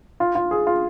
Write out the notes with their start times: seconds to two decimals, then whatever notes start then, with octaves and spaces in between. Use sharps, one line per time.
0.20 F4
0.35 F4
0.51 G#4
0.67 F4